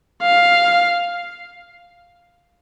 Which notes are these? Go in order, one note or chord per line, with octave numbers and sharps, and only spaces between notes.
F5